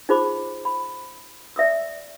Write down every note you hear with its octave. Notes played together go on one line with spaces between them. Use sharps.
D#4 F4 G#4 C5 B5 D6
B5
D5 E5 D#6 E6